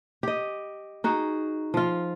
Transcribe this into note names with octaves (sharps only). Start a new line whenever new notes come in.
G4 D#5
D#4 F#4 G#4
F3 F4